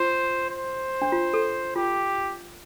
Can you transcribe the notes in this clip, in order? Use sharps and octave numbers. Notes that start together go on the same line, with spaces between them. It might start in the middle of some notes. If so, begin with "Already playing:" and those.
Already playing: F4 C5
C5
D4
F4
A4
F4 G4